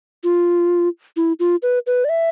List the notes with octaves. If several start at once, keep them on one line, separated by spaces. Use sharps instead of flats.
F4
E4
F4
B4
B4
D5
E5